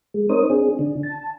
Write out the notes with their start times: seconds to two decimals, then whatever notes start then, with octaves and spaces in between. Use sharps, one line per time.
0.14 G#3
0.29 C4 D#4 A#4 C5 C#5 D#6
0.50 C4 D4 G#4
0.79 D3 D4
1.03 A5